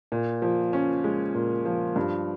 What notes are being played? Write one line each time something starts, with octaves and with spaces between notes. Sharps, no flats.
A#2
F3
C#4
G#3
A#2
F3
G2